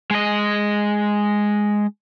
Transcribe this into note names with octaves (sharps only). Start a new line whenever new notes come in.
G#3 D#5